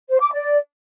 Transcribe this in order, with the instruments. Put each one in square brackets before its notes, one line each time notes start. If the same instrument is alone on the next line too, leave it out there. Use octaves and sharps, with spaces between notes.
[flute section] C5
D6
D5